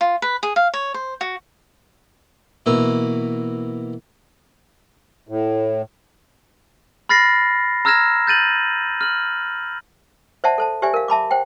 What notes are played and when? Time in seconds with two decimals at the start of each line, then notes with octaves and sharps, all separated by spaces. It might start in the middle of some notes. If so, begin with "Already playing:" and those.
0.01 F4
0.22 B4
0.43 G#4
0.56 F5
0.74 C#5
0.94 C5
1.21 F#4
2.66 B2 E3 A#3 E5
5.29 A2
7.09 B5 F6 A6 A#6 C7
7.85 A#5 E6 F6 G#6 A#6 E7
8.27 G6 A6 D#7 F#7
9.01 F6 F#7
10.44 C5 D5 E5 F#5 A5
10.58 A4 C5 A5
10.82 G4 C5 D5 E5 G#5
10.94 A#4 F5
11.08 E5 A5 B5 D6
11.31 C5 F#5 G5